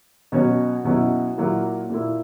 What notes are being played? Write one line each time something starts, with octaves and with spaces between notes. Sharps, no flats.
B2 F#3 C#4 F#4 C#5
B2 F#3 C#4 E4
A#2 F#3 A#3 E4
A#2 A#3 E4